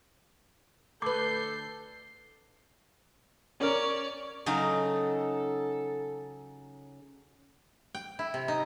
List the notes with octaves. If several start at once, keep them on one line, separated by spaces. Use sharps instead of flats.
D2 A4 B4 D6 G6 C7
C#4 A#4 C#5 D5
C#3 F#3 D#4 A4
G5
E4
C3
D#4